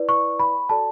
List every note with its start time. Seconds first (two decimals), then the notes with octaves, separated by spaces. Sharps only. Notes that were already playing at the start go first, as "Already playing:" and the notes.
Already playing: E4 B4 D5
0.09 C#6
0.39 B5
0.69 F#4 A4 D5 A5